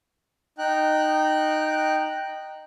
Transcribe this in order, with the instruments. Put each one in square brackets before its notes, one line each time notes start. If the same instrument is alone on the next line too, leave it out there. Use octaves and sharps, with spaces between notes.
[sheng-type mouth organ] D#4 G5 F#6